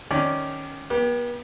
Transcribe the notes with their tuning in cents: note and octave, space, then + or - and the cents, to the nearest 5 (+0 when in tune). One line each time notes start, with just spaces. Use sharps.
D#3 -5 C#4 +0 D5 +0
B3 -40 G4 +5